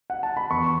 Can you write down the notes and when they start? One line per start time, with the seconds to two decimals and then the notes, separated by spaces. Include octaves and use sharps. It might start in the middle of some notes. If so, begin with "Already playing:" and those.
0.10 F#5
0.23 A5
0.37 B5
0.50 E2 C#6